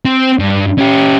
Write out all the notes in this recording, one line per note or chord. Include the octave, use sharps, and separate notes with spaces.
C4
G2
C#4 G4